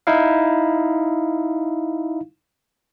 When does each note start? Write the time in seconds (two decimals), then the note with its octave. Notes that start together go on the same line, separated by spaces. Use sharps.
0.07 D#4 E4 F5